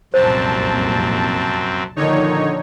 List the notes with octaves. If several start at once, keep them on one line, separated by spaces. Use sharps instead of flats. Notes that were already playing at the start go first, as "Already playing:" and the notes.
F1 C2 F#2 A#2 C4 C5 A5
A#2 D3 D#3 F3 D#4 C#5